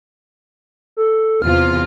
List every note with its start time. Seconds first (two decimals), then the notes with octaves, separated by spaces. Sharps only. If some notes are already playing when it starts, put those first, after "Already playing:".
0.97 A4
1.42 E2 C3 F4 F6